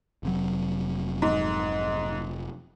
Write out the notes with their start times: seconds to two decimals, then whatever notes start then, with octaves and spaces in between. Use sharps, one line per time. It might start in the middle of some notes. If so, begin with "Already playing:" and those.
0.23 F1 C3 F#3
1.22 G#2